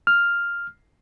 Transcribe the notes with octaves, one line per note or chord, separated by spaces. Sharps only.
F6